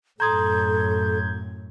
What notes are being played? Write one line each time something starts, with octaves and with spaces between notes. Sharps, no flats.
F#2 A2 A4 A#5 C6 D#6 G6 G#6